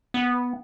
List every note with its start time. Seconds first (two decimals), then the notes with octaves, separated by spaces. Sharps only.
0.14 B3